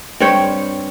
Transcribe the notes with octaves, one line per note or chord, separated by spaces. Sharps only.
G2 C4 C#5 G5